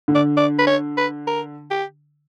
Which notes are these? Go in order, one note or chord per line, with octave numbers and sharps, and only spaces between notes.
D3
D5
D5
B4
C#5
B4
A#4
G4